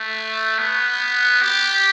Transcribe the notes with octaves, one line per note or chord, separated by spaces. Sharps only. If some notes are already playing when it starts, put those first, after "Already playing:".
Already playing: A3
B3
G4